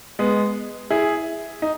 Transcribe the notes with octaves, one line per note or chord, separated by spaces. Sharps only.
G#3 B3
E4 G#4
D#4